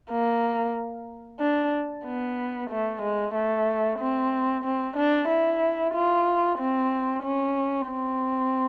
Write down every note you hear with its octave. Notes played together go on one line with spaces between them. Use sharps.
A#3
D4
B3
A3
G#3
A3
C4
C4
D4
E4
F4
C4
C#4
C4